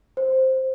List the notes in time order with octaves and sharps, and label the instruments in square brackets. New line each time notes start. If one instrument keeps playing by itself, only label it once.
[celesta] C5